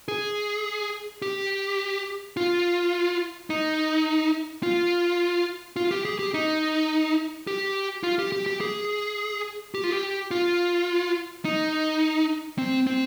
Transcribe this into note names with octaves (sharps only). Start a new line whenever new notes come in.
G#4
G4
F4
D#4
F4
F4
G4
G#4
G4
D#4
G4
F4
G4
G4
G4
G#4
G4
F4
G4
F4
D#4
C4
C4